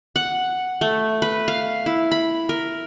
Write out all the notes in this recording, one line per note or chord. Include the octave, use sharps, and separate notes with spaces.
F#5
A3
B4
F5
E4
B5
A#4